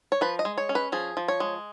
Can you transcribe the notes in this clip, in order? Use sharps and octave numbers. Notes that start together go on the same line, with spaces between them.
C#5
F3 B4
D#5
G#3
C#5
C#4
B4
F3 G#4
F3
C#5
G#3